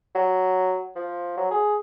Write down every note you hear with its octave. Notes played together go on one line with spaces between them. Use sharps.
F#3
F3
F#3
G#4